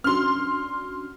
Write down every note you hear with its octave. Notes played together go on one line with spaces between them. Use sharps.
C#4 D4 F#4 C6 F6